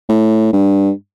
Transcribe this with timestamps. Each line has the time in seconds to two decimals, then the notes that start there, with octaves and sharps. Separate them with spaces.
0.09 A2
0.53 G2